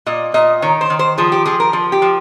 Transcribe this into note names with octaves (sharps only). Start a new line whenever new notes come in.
A#2 D#5
A#2 D#5
D#3 C#5
C5
D#3
C5
F3 G#4
G4
F3 G#4
A#4
F3
G4
F3